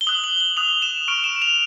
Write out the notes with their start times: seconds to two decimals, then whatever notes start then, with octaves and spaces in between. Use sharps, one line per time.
0.01 G7
0.07 D#6 F#6 F#7
0.24 F#7
0.40 F#7
0.57 D#6 F#6 F7
0.82 E7
1.08 C#6 F6 D7
1.24 E7
1.42 F7